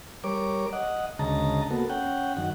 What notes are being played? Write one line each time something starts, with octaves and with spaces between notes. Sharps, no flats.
G3 A#4 C#5 D6
D#5 F#5
D2 C#3 G#3 D#5 A5 A#5
A#3 B3 F#4 A4
C#4 F#5 G5
F#2 D#3 F#5